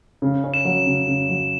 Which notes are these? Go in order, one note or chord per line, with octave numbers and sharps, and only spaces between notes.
C#3
C#4
E7
F#3
C#3
C#3
F#3